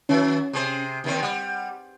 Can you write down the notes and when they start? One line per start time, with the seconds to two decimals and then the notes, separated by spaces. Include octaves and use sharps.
0.09 D#3 F#3 C#4
0.53 C3 G#4 C5
1.04 D#2 D#3 C4
1.23 G3 F#5